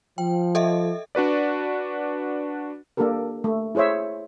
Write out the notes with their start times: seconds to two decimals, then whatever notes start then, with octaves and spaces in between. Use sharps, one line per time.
0.18 F3 G5
0.55 A4 D#5 E5
1.15 D4 F#4 B4 D5
2.97 A#3 D4 G4 A4 A#4
3.44 A3
3.75 E4 G#4 C5 C#5 E5